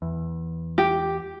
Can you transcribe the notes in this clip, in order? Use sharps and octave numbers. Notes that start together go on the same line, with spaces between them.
E2
G4